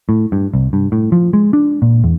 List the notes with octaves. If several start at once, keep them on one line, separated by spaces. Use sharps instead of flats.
A2
G2
C2
G2
A2
F3
G#3
D4
A#2
E2